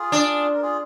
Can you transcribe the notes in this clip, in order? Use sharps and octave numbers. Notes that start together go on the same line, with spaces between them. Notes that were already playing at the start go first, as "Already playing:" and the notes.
Already playing: F4 G#4
D4
A#4
F4 G#4